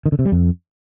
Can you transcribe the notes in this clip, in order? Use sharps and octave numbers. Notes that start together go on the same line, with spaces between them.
D#3
D3
C3
G3
F2